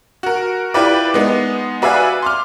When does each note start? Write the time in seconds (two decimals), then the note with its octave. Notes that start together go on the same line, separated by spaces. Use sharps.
0.23 F#4 A#4
0.74 E4 F4 G4 B4 D5
1.14 G#3 B3 D#4
1.82 F#4 B4 D5 E5 F5 G#5
2.22 C6 D6 F6